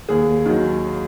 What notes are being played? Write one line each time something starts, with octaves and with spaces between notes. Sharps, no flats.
D#2 G#4
D#3 F#3